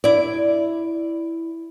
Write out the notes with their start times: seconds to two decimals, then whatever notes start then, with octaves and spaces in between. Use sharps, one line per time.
0.04 E4 D5